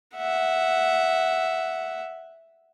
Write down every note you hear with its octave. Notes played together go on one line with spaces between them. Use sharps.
E5 F#5